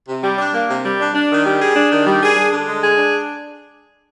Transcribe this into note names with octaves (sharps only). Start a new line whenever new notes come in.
C3
G3
D4
A#3
C3
G3
D4
D4
D#3
G3
G#4
D4
D#3
G3
G#4
D4
D3
G#3
G#4
D4